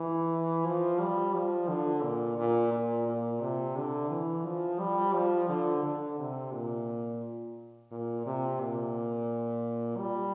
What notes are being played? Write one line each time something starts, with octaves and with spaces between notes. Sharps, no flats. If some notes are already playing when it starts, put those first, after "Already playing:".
Already playing: E3
F3
G3
F3
D3
A#2
A#2
A#2
A#2
C3
D3
E3
F3
G3
F3
D3
D3
C3
A#2
A#2
C3
A#2
G3